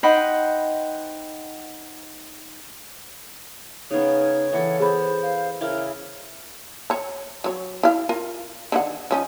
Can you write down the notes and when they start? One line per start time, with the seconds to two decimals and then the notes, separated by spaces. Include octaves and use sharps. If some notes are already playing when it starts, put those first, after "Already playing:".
0.03 D#4 C5 D#5 F#5 G5 B5
3.91 C#3 B3 D#4 C#5
4.53 E3 E4 A4 F#5
4.80 B3 G#4 C5 B5
5.23 F5
5.61 C#3 E4 A#4 D6
6.90 C#5 A#5
7.44 F#3 C#5
7.83 E4 F5
8.09 F4 A#4
8.72 D3 D#3 F#5
9.11 F3 C#4 D#4